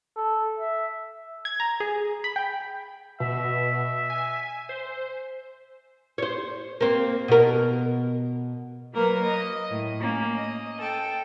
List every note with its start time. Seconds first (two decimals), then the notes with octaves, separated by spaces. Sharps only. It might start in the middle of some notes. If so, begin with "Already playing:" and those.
0.17 A4
0.59 E5
1.45 G#6
1.60 A#5
1.80 G#4
2.24 B5
2.36 G5
3.20 B2 E5
4.10 G#5
4.69 C5
6.18 C5 C#5
6.81 A#3 C4
7.28 B2 A#4
8.94 F#3 A#3 A#4 B4
9.23 D#5
9.70 A2
9.99 A#3 C#4
10.34 D#5
10.78 A4 G5